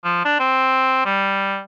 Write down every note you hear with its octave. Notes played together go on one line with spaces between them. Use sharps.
F3
D4
C4
G3